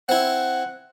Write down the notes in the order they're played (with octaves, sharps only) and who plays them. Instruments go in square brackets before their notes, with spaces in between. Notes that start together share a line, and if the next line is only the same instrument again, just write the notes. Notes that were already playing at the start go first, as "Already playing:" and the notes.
[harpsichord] C4 E4 [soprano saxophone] F#5